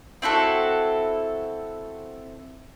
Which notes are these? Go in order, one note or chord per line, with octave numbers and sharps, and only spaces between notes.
C4 E4 F#4 A4